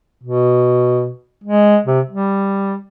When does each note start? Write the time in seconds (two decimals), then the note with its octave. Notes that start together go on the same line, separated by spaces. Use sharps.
0.23 B2
1.44 G#3
1.86 C3
2.09 G3